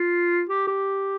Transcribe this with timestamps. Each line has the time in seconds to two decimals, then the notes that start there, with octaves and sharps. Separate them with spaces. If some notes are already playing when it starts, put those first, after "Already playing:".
Already playing: F4
0.49 G4
0.68 G4